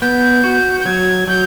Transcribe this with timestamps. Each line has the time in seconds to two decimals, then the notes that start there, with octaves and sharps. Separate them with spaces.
0.02 B3 G6
0.44 F#4
0.81 G6
0.85 F#3 G#6
1.28 F#3 G6